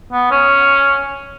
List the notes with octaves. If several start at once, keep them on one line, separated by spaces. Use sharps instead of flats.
B3
C#4